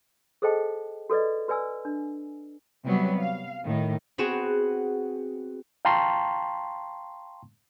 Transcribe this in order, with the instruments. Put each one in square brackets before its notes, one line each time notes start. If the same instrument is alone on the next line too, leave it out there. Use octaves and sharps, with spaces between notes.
[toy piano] G#4 A4 C5 D#5 G5 A5
F#4 A4 B4 D5 D#5
F#4 B4 D5 G#5 E6
D4
[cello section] C3 F#3 G3 B3
F5
A2 D#3
[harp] B3 C4 F#4 G#4 E7
[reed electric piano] F5 G5 A5 A#5 C6 C#6